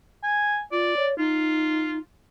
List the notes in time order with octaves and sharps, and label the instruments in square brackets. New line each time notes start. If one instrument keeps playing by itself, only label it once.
[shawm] G#5
[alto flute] F4 [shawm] D5
[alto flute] C#5
[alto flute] D#4 [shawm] F4